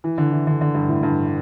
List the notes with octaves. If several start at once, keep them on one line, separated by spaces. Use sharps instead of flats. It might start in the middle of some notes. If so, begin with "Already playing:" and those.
E3
D3
E3
D3
D3
G2
A2
G2